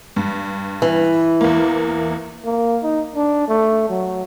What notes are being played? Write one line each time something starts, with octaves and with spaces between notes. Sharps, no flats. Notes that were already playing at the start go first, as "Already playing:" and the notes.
G2
E3
E2 A#3
A#3
D#4
D4
A3
F#3